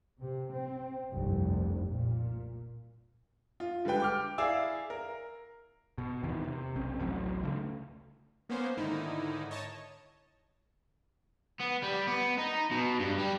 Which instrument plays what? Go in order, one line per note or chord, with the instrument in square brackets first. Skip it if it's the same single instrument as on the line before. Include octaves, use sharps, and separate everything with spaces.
[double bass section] C3
C4
F1 C2 G2
A#2
[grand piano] F4
D3 G3 G#3 B4 G5
G5 D6 F6
E4 G#4 D5 F5 G#5 E6
A#4
[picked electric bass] B2
E2 C3 D#3 E3
C3
B1 C4 C#4
A1 D2 A2 F#3
C#3 E3 A3
[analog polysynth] A#3 B3 C#4 C5
G#2 D3 D#3 D#4 E4
C#5 D#5 A5
[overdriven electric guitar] B3
G3
B3
D#4
B2
G2
G3